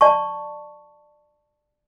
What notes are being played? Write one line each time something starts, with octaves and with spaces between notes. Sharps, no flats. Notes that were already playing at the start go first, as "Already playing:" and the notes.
D5 A5 C#6